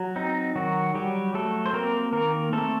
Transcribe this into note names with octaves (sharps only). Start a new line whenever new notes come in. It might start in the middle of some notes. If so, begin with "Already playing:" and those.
Already playing: F#3
C4 D#4
D#3 F#3 F#4
F#3 G3 G4
F#3 A3 A4
C5
A#3 C4 A#4
D#3 A#3 A#4
A3 C4 A4